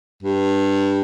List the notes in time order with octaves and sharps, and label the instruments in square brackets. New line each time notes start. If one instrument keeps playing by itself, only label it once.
[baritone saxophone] G2